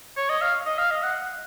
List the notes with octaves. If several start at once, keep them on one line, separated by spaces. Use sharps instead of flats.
C#5
D#5
F5
D#5
F5
D#5
F#5